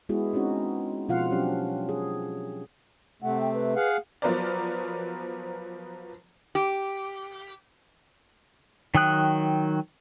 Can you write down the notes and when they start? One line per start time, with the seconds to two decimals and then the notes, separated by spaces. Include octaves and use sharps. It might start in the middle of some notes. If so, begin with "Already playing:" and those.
0.09 G#3 B3 E4 F#4 G#4
0.33 C4 C#4 D#4 F#4
1.09 B2 F3 F4 F5 F#5
1.32 F#3 C#4 D4 G4
1.89 G#4
3.22 C3 A3 F#5
3.41 G5
3.54 B4
3.76 G#4 F5 F#5
4.22 F3 F#3 B3 A#4 C5 D5
6.55 G4
8.95 D#3 F#3 G5 D#6 F#6